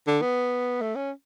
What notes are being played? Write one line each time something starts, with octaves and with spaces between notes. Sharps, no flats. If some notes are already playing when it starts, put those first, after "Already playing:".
D3
B3
A3
C#4